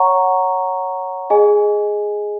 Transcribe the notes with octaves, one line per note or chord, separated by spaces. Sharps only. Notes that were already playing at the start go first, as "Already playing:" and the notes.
Already playing: C#5 F#5 A#5 C#6
G#4 D#5 G#5